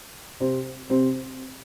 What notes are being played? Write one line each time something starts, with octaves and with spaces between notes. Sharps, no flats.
C3 C4
C3 C4